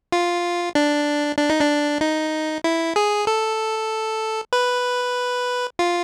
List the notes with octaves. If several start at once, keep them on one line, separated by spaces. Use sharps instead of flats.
F4
D4
D4
D#4
D4
D#4
E4
G#4
A4
B4
F4